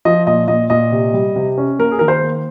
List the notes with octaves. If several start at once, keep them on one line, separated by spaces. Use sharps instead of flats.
F3 D#5
A#2 D#5
A#2 D#5
A#2 D#5
C3
G3
C3
C#4
A#3 A#4
G#4
D#3 A#4
C5
A#3